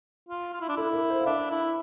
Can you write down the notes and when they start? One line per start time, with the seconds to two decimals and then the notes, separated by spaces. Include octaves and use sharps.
0.29 F4
0.53 F4
0.61 E4
0.69 D4
0.77 E4 A4
0.93 A#4
1.10 C5
1.19 F5
1.26 D4 E5
1.51 E4